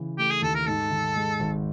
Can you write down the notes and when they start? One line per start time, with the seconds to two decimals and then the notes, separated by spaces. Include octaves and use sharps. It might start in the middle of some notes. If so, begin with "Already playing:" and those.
Already playing: C#3 E3
0.19 A3 G4
0.31 G#4
0.42 D#2 A4
0.55 A#4
0.67 G#2 A4
0.91 D#3
1.16 G#3
1.40 G#1